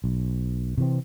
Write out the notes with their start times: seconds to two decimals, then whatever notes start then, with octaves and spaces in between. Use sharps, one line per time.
0.04 B1
0.78 C3 E3 C4